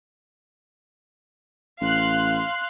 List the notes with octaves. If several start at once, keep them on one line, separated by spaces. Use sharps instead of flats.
A1 F5 C6 F#6